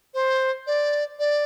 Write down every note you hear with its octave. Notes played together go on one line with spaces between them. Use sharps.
C5
D5
D5